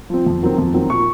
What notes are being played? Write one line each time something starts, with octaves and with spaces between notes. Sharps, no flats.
F3 C4
F2
D#3 F#3 C4
F2
D#3 F#3 C4
A#2 C#6